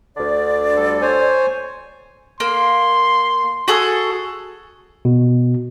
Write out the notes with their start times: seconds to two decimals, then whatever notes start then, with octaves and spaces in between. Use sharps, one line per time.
0.17 D2 D3 D5
0.76 G3 A4
1.02 C5 C#5 G#5
2.40 A#3 C6
3.68 F#4 G#4 A4
5.05 B2